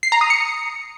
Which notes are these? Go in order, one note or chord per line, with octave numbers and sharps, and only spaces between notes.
C7
A#5
D#6
C#7